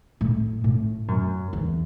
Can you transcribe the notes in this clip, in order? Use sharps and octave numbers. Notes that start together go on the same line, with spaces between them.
A2
A2
F#2
E2